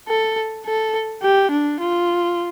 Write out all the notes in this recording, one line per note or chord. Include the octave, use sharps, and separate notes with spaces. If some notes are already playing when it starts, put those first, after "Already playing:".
A4
A4
G4
D4
F4